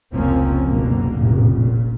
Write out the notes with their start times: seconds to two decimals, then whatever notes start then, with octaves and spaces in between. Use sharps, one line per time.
0.12 F1 C#2 F3 A#3 C4 C#4
0.65 F#1 F#2 B2 D3 A#3
1.12 F1 A#1 A2 C#3
1.56 A#2